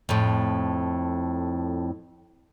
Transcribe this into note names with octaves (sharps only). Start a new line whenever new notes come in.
F2 A2